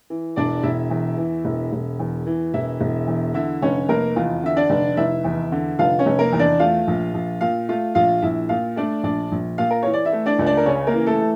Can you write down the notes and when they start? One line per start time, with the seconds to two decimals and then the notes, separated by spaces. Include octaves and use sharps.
0.10 E3
0.36 E1 D4 D5
0.63 E1 E4 E5
0.90 E2
1.17 E3
1.45 E1
1.73 E1
1.99 E2
2.27 E3
2.54 E1 E4 E5
2.81 E1
3.07 E2
3.34 D3 E4 E5
3.62 F1 C#4 C#5
3.89 F1 A#3 A#4
4.16 E2 F4
4.43 D3 E5
4.57 D4 D5
4.70 F1
4.97 F1 E4 E5
5.24 E2
5.52 D3
5.79 F1 F4 F5
5.99 C#4 C#5
6.06 F1
6.19 A#3 A#4
6.33 E2
6.39 D4 D5
6.59 A3 F4 F5
6.87 A#1
7.14 A#1
7.41 A#2 F4 F5
7.68 A3 F4 F5
7.95 A#1 F4 F5
8.22 A#1 E4 E5
8.49 A#2 F4 F5
8.76 A3 D4 D5
9.03 A#1 D4 D5
9.32 A#1
9.58 A#2 F4 F5
9.71 A#4
9.83 E3 C#5
9.93 D5
10.05 E4 E5
10.12 A3
10.26 D4 D5
10.39 C#2
10.46 D4 D5
10.57 A#4
10.66 C#3 C#4 C#5
10.87 A#3 A#4
10.94 E3
11.07 A3 A4
11.21 A3